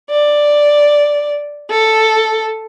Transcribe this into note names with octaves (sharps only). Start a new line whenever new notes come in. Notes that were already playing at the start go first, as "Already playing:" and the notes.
D5
A4